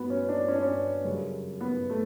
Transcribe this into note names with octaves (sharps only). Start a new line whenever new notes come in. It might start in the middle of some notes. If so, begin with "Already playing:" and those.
Already playing: G2 F#3 B3
C#4
D4
C#4
D4
C#4
F#2 C#3 G3
B3
A3